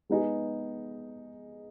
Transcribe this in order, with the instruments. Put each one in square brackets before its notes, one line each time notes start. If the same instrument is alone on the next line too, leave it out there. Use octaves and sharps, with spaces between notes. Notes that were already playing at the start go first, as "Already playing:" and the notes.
[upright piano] G#3 B3 D#4 G#4